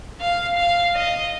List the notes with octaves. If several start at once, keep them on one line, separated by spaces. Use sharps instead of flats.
F5
F5
D#5